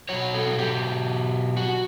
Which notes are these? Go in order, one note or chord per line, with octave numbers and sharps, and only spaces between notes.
B2 F#3 C#5
A4
G4
F#4